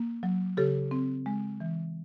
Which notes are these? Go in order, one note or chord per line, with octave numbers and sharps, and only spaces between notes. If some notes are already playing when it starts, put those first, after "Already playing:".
Already playing: A#3
F#3
C#3 G4 A4
C4
G#3
E3